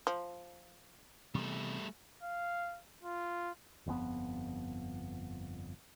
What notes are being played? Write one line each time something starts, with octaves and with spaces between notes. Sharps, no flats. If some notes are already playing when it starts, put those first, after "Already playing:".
F3
C3 E3 G3 A3 B3
F5
F4
G1 F2 D3 B3